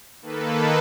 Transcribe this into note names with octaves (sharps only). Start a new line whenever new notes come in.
D#3 A#3 A4 B4